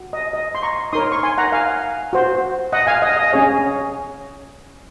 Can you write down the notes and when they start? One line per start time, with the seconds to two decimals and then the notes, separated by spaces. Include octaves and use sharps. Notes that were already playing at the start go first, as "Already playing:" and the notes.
Already playing: F#4
0.13 D#5
0.33 D#5
0.55 C6
0.63 A#5 C#6
0.93 D#4 A#4 C#5 C6 D#6
1.12 C#6
1.23 G#5 C6
1.38 F#5 A#5
1.52 F5 G#5
2.13 F#4 C5
2.73 D#5 F#5
2.87 F5 G#5
3.02 D#5
3.17 D#5
3.33 C#4 G#4 C#5